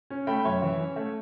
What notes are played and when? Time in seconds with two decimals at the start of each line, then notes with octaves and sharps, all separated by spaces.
0.10 C#4
0.27 A3 G5 B5
0.44 F#2 C#5 E5
0.62 E3
0.79 C#4
0.96 A3